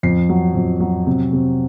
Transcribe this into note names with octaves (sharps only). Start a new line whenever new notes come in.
F2 C7
F#3
F2
F#3
C3
C3